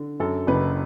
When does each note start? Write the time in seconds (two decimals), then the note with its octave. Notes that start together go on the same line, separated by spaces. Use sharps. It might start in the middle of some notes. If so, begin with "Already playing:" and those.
Already playing: D3
0.20 F#2 A4
0.47 F#1 B4